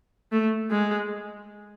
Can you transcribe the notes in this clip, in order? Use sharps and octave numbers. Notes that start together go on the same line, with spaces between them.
A3
G#3